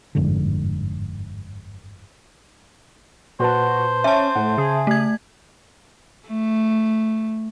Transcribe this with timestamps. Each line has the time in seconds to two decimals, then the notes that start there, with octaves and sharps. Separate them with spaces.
0.15 G1 F2 G#2 D3
3.40 A#2 F#4 B4 C5 A5
4.04 C#4 E5 A5
4.36 A2 F#5
4.58 C#3 G#4
4.87 A3 G#6
6.28 A3